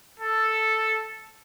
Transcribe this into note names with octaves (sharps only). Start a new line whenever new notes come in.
A4